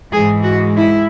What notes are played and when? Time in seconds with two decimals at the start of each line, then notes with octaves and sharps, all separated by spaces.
0.11 G#2 E3 G#3 G#4
0.43 F#4
0.76 E4